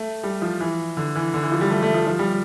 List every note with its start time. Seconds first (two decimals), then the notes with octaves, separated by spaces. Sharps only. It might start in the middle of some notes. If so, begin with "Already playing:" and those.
Already playing: A3
0.24 G3
0.42 F3
0.60 E3
0.97 D3
1.16 E3
1.34 D3
1.43 E3
1.52 F3
1.61 G3
1.70 A3
1.82 A3
1.94 F3
2.07 F3
2.19 G3